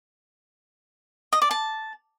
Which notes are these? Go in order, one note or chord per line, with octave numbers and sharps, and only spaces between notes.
D#5
D5
A5